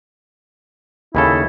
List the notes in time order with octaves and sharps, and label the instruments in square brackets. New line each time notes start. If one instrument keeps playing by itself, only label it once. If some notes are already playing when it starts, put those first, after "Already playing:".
[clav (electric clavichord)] D#2 C#3 A4 [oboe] E4